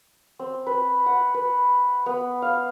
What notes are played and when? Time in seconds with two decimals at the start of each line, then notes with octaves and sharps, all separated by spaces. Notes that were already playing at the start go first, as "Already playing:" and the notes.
0.39 C4
0.67 B4
1.06 F#5
1.34 B4
2.06 B3
2.42 F5